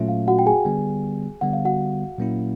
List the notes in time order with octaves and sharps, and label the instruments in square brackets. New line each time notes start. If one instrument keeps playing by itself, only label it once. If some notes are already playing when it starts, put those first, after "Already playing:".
Already playing: [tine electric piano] A#2 F#3 A3 C#4 F4 [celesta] E5
[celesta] F5
F#4 F#5
G5
G#4 G#5
[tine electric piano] D3 G3 B3
[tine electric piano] D3 G3 B3 [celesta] F#5
[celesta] F5
F#4 F#5
[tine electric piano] A#2 F#3 A#3 C#4 E4